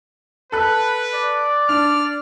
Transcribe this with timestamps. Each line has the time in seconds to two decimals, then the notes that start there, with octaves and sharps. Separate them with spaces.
0.52 A4 B4 B5 F#6
1.14 D5
1.69 D4 F6